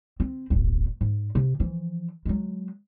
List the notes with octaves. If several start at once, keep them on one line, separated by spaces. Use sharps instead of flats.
C4
D1 G1
G#2
C3
E3 F3
F#3 G#3